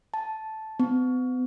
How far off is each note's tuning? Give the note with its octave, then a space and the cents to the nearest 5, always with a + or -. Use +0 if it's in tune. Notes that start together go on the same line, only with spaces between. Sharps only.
A5 -5
B3 +40